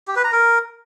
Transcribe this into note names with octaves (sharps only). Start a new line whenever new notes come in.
G4
B4
A#5
A#4